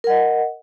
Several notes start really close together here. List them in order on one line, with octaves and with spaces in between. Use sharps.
A#4 F#5 D#5